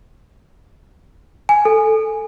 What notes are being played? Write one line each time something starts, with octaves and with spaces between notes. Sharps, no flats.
G#5
A4